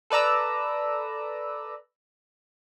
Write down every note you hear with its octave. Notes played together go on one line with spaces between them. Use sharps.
A4 B4 D5 A#5 E6